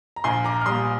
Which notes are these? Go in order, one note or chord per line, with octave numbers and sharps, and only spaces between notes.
A#5
A#1 G#5 C6
A#5 D6
F6
A#2 G3 C6 D#6